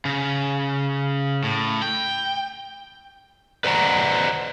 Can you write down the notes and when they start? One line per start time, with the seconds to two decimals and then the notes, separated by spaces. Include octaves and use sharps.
0.05 C#3
1.43 A2
1.82 G5
3.64 B4 C5 D5 F#5 A#5